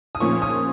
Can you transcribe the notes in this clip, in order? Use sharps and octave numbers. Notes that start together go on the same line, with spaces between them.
D#6
A#2 F3 A#3 C#4 C#6
D#6